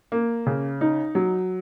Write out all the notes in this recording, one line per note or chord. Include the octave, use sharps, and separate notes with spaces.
A#3
C#3
D#4
F#3